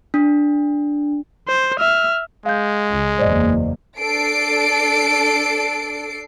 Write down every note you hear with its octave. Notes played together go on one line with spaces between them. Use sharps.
D4
C5
E5 F6
G#3 F5 G6
C#2
F#1 E2 A#3 C5 D5 D#5
D4 A4 C7 D7